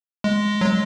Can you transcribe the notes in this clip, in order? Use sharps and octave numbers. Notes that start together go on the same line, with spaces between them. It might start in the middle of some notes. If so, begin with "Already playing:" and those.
G#3
F#3
G#3